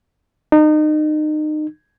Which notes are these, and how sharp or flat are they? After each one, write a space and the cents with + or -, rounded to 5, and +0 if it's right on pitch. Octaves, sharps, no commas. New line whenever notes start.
D#4 -30